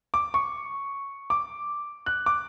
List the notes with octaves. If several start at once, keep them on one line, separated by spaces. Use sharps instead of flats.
D6
C#6
D6
F#6
D6